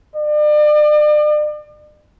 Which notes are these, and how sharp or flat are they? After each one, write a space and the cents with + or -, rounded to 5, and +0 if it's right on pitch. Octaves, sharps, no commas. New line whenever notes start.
D5 +40